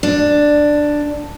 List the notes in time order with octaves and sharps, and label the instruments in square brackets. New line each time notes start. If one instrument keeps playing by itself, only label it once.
[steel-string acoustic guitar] D4